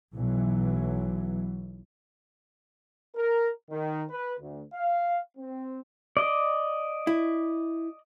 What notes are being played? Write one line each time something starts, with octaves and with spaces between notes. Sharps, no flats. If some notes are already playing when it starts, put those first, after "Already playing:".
B1 E3 F#3
A#4
D#3
B4
D2
F5
C4
D5 D#5
E4